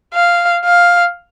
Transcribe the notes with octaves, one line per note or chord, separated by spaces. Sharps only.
F5
F5